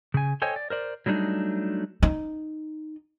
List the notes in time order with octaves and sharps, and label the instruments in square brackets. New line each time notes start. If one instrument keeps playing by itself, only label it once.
[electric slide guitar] C#3 G#5
A4 C5 C#5 D#5 G5 G#5
D5
A#4 C5 D5
F#3 G3 A3 D4 D#4
[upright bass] D#4